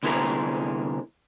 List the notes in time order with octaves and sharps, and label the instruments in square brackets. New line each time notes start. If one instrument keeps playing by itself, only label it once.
[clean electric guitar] C2 D3 B3 E4 G#4 A#4